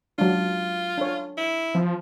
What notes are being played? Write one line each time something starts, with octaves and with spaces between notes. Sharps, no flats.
F#3 G#3 D4 F4
D4 A4 C#5
E4
F3 C4